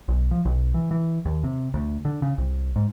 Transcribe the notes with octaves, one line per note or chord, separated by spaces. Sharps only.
B1
F3
B1
E3
E3
D#2
C3
D2
D3
C#3
C2
G#2